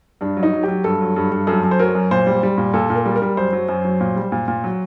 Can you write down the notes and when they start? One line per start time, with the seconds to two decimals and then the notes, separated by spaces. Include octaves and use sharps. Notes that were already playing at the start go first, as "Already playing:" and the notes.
0.21 G2 D4
0.37 F#3
0.43 D#4
0.53 F#3
0.63 F#3 G4
0.84 G2 A4
1.00 F#3
1.16 G2
1.32 G2
1.47 F#2 A4
1.63 F#2
1.71 C5
1.79 F#3 A#4
1.95 F#2
2.11 A#2 C5
2.27 G3
2.43 G3
2.58 A#2
2.74 A#2 A4
2.90 A#2
2.95 A#4
3.05 G3
3.16 A#4
3.22 G3
3.37 F#2 C5
3.53 F#3
3.69 F#2
3.85 F#3
4.01 A#2
4.16 G3
4.32 A#2
4.48 A#2
4.64 F#3